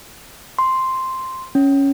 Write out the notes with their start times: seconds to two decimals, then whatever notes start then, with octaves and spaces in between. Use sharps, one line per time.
0.59 C6
1.55 C#4